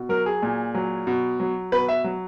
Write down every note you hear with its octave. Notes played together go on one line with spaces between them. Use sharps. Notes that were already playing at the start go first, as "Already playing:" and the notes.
Already playing: B2
F#3 A#4
G#4
A#2
F#3
B2
F#3
B2 B4
E5
F#3